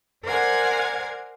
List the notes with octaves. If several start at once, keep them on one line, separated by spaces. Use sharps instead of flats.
A#4 C5 D5 F#5 G#5 G#6